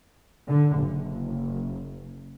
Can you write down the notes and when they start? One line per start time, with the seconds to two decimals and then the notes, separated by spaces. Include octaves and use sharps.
0.47 D3
0.78 F#1